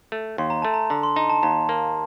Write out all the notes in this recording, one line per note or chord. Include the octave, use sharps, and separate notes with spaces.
A3
D#2 C6
A#5
A3 A5
A#5
D3 A#5
C6
D#4 A#5
A5
D#2 A#5
A#3